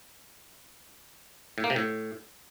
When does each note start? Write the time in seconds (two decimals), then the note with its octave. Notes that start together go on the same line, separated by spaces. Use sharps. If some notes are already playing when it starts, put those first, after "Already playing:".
1.58 A2
1.64 A#3
1.70 C3
1.76 A2